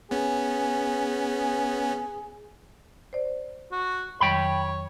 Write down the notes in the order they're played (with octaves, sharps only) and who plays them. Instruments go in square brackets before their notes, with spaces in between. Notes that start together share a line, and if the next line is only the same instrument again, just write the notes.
[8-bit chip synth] B3 C#4 [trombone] G#4
[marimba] C5 D5
[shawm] F#4
[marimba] F2 D#3 F#3 [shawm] C#5 [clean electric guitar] G5 B5